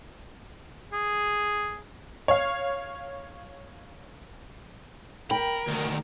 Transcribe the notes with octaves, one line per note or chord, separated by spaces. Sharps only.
G#4
C#5 F5
A#4 G5 B5
D2 D#3